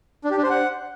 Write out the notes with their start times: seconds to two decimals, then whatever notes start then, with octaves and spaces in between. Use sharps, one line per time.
0.24 D4
0.31 G4
0.37 D4
0.43 C5
0.50 F#5